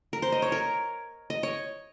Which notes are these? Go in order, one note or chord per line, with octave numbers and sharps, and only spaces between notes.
A#4
C5
D#5
C#5
A#4
D#5
C#5